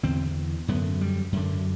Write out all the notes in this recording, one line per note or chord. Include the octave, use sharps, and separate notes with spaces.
E2 D3 C4
F#2 D3 B3
G3
F#2 D3